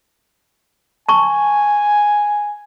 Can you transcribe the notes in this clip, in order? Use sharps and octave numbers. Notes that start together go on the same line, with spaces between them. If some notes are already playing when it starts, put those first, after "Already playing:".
G#5 A5 C#6